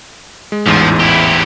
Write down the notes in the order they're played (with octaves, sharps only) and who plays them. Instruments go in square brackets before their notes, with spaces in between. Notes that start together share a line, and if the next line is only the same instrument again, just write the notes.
[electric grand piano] G#3
[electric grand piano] A1 E2 G#2 [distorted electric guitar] F3
[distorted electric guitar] E4 G4